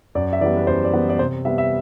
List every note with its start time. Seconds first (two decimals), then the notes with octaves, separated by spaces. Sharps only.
0.15 F#2 D5
0.33 E5
0.41 E3 G3 B3 D5
0.57 B4
0.67 F#2 C5
0.85 D5
0.93 E3 G3 B3
1.09 D5
1.19 C3 C5
1.45 G3 B3 E5
1.58 E5